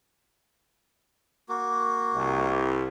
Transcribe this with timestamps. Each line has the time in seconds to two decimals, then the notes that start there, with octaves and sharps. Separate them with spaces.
1.49 A#3 F#4
2.15 C2